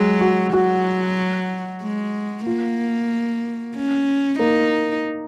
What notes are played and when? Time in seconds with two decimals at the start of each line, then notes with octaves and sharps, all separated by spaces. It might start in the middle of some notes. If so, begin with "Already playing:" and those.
Already playing: F#3 G#3
0.21 F#4
0.53 F#3 F#4
1.82 G#3
2.46 A#3 F4
3.75 C#4
4.39 A#3 D#4